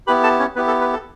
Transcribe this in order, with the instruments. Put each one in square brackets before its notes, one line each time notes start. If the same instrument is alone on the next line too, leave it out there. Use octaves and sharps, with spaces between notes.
[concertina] B3 E4 G4 B4 B5
A4 A5
C#4 C#5
B3 E4 G4 B4
A4
B4
A4